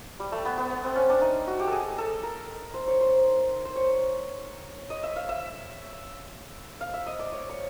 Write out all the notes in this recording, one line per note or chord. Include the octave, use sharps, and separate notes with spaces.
G3
A3
B3
B3
B3
C4
C#4
D4
D#4
F#4
G4
A4
G#4
A4
A#4
C5
C#5
C5
C5
C#5
D#5
E5
F5
E5
F5
E5
D#5
D5
C#5
C#5